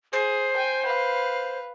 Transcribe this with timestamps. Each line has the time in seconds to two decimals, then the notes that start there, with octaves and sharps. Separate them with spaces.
0.13 G#4 C5
0.56 G5 G#5
0.85 B4 F5